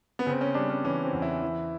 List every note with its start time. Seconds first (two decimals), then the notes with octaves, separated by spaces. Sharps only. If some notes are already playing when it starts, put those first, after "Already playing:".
0.19 B3
0.26 C#3 C4
0.41 C#4
0.54 G3 D4
0.69 C#4
0.84 E3 C#4
1.03 C4
1.13 E2
1.22 E4
1.42 E3